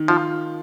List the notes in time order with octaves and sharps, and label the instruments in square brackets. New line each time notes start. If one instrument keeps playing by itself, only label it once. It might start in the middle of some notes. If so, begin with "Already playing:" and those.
Already playing: [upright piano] D#3
[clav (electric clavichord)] F3 [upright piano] F4